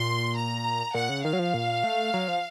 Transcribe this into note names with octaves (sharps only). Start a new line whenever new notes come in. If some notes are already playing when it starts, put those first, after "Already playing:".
Already playing: A#2 C6
A#5
A#2 F#5
C#3
D#3 F5
F#3
F3
A#2
A3
F#3
F3